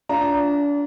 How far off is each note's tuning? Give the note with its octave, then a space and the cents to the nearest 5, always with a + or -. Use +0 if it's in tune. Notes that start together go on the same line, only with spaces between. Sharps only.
D4 -30 F4 +0 A#5 +0